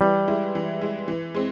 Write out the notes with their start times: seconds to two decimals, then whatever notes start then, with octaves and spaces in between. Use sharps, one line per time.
0.01 E3 G3
0.28 G#3 E4
0.55 E3
0.81 G#3 E4
1.08 E3
1.35 G#3 C4